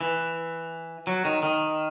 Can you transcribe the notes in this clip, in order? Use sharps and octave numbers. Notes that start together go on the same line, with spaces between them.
E3
F#3
D#3
D#3